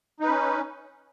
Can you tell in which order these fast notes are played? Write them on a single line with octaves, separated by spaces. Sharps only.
D#4 B4 C#4